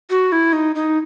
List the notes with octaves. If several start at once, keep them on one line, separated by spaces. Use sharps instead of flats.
F#4
E4
D#4
D#4